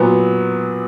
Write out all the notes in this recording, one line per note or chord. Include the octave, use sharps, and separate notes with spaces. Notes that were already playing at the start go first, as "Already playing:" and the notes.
Already playing: A#2 F#3 B3